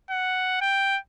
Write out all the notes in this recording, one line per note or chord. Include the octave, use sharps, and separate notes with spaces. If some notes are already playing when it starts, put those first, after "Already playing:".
F#5
G5